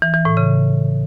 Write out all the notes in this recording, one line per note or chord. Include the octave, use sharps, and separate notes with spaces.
E3
E3
A2
C#3